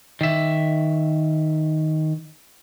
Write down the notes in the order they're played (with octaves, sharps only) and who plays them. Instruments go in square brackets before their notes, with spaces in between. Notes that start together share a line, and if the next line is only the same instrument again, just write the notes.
[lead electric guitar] D#3 E5